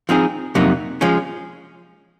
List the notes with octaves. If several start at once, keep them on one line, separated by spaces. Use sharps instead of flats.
F3 C4 D#4 G#4
F2 C3 F#3 A#3 D#4
F3 G#3 C#4